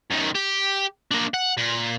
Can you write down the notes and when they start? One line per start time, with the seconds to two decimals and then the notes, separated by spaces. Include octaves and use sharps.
0.11 F#2 D#3
0.35 G4
1.11 A#3 D4
1.34 F#5
1.57 A#2